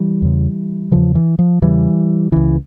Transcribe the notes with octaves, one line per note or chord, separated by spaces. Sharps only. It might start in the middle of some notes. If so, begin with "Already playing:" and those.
Already playing: E3 G3
E2 C#3
E2 C#3 F3
E3
F3
E2 C#3 E3 G3
C#2 C#3 E3